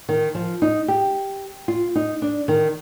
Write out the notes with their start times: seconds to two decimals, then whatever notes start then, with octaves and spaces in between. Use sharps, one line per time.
0.09 D#3
0.35 F3
0.62 D#4
0.88 G4
1.68 F4
1.95 D#4
2.22 D4
2.48 D#3